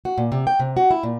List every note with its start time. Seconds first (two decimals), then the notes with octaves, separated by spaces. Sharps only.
0.05 F#4
0.18 A#2
0.32 C3
0.47 G5
0.59 C3
0.77 F#4
0.91 E4
1.03 A#2